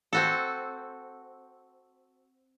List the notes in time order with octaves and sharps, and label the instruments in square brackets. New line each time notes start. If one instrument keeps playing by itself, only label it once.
[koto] C4 F#4 A4